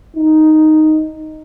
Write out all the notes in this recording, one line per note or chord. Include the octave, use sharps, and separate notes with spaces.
D#4